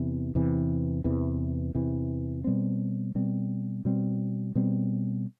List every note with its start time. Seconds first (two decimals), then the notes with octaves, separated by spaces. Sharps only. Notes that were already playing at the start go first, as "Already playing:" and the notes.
Already playing: E2 C3 E3
0.35 E2 C3 E3
1.04 E2 C3 E3
1.75 E2 C3 E3
2.44 B2 G3 C4
3.15 B2 G3 C4
3.85 B2 G3 C4
4.55 B2 G3 C4